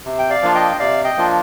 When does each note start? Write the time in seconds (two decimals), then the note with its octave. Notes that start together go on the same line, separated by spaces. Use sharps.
0.05 C3
0.19 G5
0.30 D5 F5
0.42 F3 A#3 D4 F4
0.55 D#5 G5
0.79 C3 D5 F5
1.04 D#5 G5
1.17 F3 A#3 D4 F4